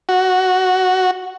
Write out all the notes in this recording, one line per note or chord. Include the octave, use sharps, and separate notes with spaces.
F#4